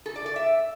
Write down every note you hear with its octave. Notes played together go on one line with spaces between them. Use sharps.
A4
D5
D5
E5